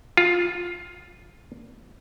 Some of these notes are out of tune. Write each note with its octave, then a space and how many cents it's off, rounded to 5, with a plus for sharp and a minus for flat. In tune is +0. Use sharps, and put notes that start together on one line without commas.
F4 +10